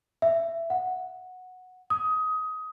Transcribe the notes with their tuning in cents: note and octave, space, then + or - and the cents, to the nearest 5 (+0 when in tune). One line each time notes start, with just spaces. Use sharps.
E5 +15
F#5 -10
D#6 +20